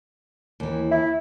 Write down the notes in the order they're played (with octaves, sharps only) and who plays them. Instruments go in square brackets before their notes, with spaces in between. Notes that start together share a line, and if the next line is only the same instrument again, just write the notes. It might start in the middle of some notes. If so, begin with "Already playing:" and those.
[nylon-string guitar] D#2 E3
[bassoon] E4